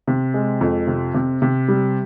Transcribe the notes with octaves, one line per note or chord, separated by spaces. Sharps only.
C3
G#3
F2
C3
C3
C3
G3